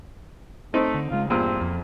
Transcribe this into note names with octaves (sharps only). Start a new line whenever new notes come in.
A3 C4 D#4
D3
C#3 G#3 F4
E2 G2 A#2 C4
F2